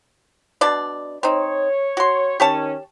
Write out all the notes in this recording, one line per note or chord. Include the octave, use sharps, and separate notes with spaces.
B2 D4 D5
C4 D#4 C#5
F#4 C6
D#3 C#4 G4 C#5 A5